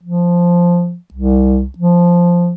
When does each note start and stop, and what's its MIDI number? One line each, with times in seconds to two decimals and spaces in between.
0.03 0.95 53
1.14 1.66 36
1.78 2.55 53